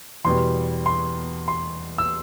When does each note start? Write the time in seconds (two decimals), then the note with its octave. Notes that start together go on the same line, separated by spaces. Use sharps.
0.25 E2 B2 G3 C6
0.86 C6
1.48 C6
1.98 E6